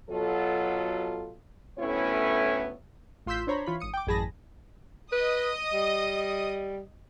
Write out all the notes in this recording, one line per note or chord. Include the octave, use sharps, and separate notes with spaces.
B2 F#3 F4 A4
D2 A2 B3 C#4 E4 C#5
A1 F4 C6 E6 G6 B6
D4 C5 C#5 A#5 B5
E3 F4 C#5 B5
G#1 D#6 C#7
G5 D6
A1 F#2 G#4 A5 B5 A#6
B4 D#5 D#6
G3